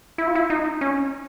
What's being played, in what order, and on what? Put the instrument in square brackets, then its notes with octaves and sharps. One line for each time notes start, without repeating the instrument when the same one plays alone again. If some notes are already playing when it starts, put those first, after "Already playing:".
[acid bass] E4
F4
E4
D#4
C#4